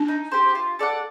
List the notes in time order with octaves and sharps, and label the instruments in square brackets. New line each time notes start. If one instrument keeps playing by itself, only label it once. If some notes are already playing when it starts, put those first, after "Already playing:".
Already playing: [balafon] D4
[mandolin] D#4
G4 C5
F4
A4 D5 F#5